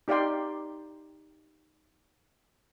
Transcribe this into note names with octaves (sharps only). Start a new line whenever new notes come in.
D#4 G4 D5 F5 G5 C6